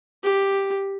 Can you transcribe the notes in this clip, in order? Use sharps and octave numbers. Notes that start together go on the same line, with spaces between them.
G4